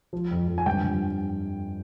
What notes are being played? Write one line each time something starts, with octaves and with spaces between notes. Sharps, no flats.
F3
F2
F2
G#5
G2 G5
G2